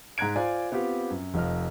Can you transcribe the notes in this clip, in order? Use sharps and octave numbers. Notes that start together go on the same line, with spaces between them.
G#2 A#5 F#6 G#6 D7
F4 C5 D5 G#5
B3 C4 F4 G4
F#2
F1 F3 D#5 F6